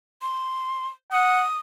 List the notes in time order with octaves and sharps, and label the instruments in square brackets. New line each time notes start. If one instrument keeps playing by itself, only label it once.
[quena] C6
[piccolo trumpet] F#5 [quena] D#6